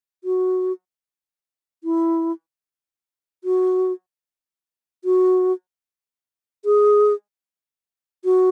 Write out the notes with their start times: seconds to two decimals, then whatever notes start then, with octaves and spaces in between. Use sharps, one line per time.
0.24 F#4
1.84 E4
3.44 F#4
5.05 F#4
6.65 G#4
8.25 F#4